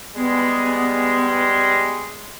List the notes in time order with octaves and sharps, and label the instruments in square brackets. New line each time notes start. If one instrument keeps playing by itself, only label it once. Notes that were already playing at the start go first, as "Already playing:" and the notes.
[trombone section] G3 G#3 [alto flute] B3